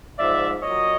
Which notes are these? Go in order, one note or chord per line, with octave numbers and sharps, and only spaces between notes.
G#2 F3 D5 E5
A#2 F#3 C#5 D#5